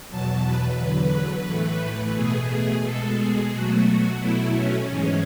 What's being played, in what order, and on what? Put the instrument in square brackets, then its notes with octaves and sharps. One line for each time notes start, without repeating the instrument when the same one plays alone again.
[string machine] E2 B2 F#3 A5
B4
E2 D3 F#3
A2 E3 A3
B2 A3 G#4
B2 G#3 A4
G#4
B2 F#3 A3 F#4
B2 F#3 A3 E4
C#4
G#2 E3 G#3